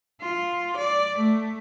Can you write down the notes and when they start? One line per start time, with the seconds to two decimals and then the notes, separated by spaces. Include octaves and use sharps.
0.21 F4
0.76 D5
1.18 A3